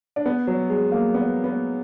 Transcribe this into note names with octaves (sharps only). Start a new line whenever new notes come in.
D4
B3
F#3
G#3
A#3
B3
B3